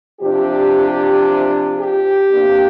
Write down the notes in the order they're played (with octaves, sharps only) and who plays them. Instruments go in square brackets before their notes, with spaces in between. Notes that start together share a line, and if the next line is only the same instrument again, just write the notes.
[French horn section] C3 F3 D4 G4
G4
C3 A#3 D4